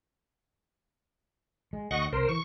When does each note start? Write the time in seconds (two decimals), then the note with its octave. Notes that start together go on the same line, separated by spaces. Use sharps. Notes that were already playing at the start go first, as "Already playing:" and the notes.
1.73 G#3
1.91 D2 D#5 F#5 C#6
2.13 C2 A#4 C5
2.29 E3 C#6